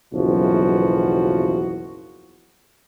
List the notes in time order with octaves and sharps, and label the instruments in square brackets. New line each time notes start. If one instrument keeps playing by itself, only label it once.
[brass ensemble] F#1 B1 E2 F3 F#4